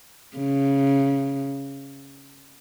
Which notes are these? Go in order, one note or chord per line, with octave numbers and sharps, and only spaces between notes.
C#3